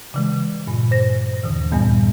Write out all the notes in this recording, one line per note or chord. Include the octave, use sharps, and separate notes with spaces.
C#3 E3 G#3
G2 A#2
C5 A#6
D#2 D3 E3
D2 G2 A#2 G3 B3